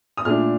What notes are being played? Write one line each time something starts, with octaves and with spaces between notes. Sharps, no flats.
D#6
A#2 A3 D4 F6